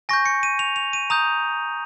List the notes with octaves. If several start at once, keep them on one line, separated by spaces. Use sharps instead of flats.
G#5 C#6 G6 A#6
C#7
D#7
F7
F7
D#7
A#5 D#6 G6 F7